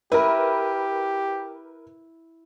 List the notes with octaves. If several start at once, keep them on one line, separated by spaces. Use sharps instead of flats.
E4 G4 A#4 B4